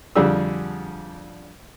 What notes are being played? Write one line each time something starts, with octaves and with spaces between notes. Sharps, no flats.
F2 D3 G3 D4 G#4 E6